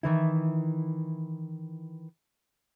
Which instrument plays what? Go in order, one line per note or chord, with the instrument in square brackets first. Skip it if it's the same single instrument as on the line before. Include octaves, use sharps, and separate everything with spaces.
[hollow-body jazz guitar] D#3 E3 E4